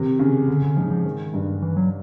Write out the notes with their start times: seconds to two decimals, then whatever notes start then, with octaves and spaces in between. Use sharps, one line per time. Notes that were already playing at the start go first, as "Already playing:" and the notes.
Already playing: C3 D#3
0.19 C#3
0.48 D3
0.62 D3
0.76 G#2 F3
0.90 F3
1.05 D#3
1.34 G2
1.62 E3
1.77 F#3